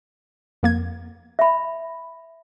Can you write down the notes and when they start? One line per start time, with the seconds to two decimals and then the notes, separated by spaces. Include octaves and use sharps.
0.63 F2 A#3 G#6
1.39 E5 B5